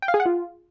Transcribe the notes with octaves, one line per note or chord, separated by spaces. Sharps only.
G5
F5
G#4
F#5
F4